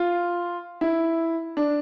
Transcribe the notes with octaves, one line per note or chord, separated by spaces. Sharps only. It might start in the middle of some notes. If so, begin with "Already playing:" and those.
Already playing: F4
E4
D4